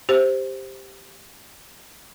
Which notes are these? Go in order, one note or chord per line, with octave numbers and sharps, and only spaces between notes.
G4 C5